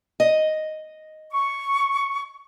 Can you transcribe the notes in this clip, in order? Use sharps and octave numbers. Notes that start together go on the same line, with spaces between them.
D#5
C#6